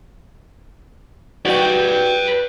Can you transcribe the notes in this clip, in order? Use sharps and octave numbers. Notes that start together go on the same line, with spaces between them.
F#4 B4 D5 G5